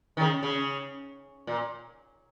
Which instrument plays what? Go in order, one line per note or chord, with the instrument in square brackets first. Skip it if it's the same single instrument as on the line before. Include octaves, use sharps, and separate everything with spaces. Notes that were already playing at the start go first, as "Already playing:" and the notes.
[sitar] D#3
C#3
C#3
A#2